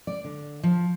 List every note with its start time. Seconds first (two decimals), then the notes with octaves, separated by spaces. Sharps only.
0.07 D5
0.25 D3
0.63 F3